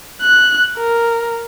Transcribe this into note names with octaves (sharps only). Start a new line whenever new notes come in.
F#6
A#4